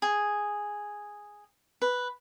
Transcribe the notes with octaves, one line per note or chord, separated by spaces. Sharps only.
G#4
B4